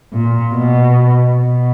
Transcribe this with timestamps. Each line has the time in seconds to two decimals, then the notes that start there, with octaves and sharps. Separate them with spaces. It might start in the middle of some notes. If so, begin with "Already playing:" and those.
0.13 A#2
0.54 B2
1.37 B2